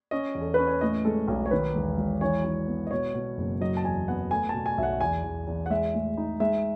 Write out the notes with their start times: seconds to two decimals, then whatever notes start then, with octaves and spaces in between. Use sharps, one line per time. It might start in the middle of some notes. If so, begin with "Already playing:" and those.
0.11 C#4 D#5
0.35 E2
0.41 A4
0.54 C#4 B4
0.67 C#5
0.81 A2 D#5
1.05 G#3 A4
1.28 B1
1.46 C#5
1.51 D#3 B4
1.75 E1
1.98 E1
2.21 E3 C#5
2.45 E3
2.68 B3
2.87 D#5
2.91 B2 C#5
3.15 B2
3.38 F#1
3.61 F#3 D#5
3.77 A5
3.84 E2 G#5
4.08 B3 F#5
4.31 A3 G#5
4.49 B2 A5
4.66 G#5
4.78 B1 E5
4.83 F#5
5.01 E2 G#5
5.24 E2
5.47 E2
5.66 F#5
5.70 G#3 E5
5.94 A2
6.18 D#4
6.40 G#3 E5